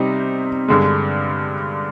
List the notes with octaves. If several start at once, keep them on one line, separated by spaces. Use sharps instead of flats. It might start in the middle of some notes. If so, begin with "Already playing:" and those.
Already playing: C3 G3 C4 D#4
G2 D3 G#3